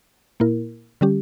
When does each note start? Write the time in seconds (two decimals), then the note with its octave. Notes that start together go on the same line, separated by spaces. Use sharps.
0.40 A#2 A#3 E4 A#4
1.01 D3 G3 C#4 G4